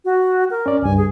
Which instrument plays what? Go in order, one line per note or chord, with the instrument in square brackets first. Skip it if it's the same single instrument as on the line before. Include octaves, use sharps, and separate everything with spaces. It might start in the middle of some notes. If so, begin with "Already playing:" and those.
[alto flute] F#4
A#4
[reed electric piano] C#4 D5
[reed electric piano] C#2 G2 [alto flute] G#5
[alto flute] G#4